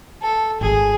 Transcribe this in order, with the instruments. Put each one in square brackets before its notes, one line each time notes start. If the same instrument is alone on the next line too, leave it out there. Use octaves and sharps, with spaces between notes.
[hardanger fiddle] A4
[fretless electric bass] G#1 [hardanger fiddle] G#4